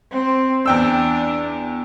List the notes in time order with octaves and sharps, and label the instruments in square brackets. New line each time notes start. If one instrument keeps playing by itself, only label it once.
[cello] C4
[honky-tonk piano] E2 G5 E6 [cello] D4